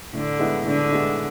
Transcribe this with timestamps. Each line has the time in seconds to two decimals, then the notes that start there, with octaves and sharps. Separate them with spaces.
0.13 A2 D3
0.39 G#3 B3 E4
0.65 A2 D3
0.92 G#3 B3 E4